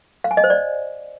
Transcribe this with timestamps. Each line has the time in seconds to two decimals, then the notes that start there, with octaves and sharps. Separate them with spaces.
0.24 F5
0.31 G#5
0.37 D#5
0.44 C5
0.50 D5